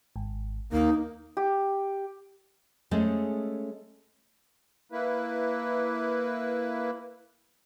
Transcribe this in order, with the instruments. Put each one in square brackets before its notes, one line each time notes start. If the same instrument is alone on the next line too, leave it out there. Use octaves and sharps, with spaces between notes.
[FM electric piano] G#1
[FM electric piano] D#2 [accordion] A#3 [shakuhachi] D#4
[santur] G4
[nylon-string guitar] G#3 A3 C#4 G#4 A4 C5
[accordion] A#3 E4 B4